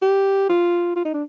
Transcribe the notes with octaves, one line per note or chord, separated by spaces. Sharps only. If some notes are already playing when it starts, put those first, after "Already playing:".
G4
F4
F4
D#4
D4